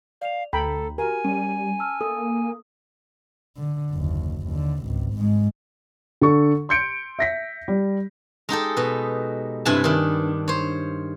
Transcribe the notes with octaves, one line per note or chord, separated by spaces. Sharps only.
D5 F5 F7
D2 A4 G5 A#5 B5
F#4 G4 A#4 G#5
G3 C#4 D#7
A5 E6 F6
A#3 A4 D#6
D3
F#1 D#2
D#2 D3
G#1 C#2
G#2 G#3
D3 A4 C#6
C6 G6 C#7 D7
E5 A#6 B6
G3
G#3 D#4 G4 A4
B2 B4
G2 C3 E4 B4 G#5 A5
D#3 D4
C5 C#5